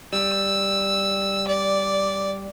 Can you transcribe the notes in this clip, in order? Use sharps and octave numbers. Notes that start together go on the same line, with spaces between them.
G3 E6
D5